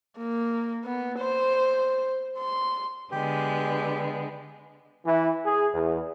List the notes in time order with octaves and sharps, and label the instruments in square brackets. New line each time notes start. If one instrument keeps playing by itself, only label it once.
[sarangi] A#3
B3
C5
C6
[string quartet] D3 G#3 B3 [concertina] G4
[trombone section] E3
G#4
E2